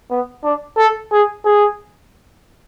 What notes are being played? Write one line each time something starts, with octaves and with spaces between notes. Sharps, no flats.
B3
D4
A4
G#4
G#4